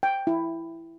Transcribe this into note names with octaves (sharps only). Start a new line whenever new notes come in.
G5
E4